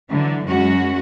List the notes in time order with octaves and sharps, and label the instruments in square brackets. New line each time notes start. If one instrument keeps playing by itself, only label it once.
[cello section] D3 E3 F#3
F#2 F#3 G#3 C#4 F#4